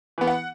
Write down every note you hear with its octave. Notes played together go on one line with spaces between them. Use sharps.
E3 B3
F#5